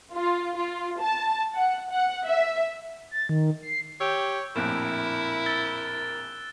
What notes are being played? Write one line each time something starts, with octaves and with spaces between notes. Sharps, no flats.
F4
F4
A5
F#5
F#5
E5
A6
D#3
C7
G4 C#5 E6 G6
A#1 F2 A2 E4 A#4 F#6 D7 E7
E6 A6 G7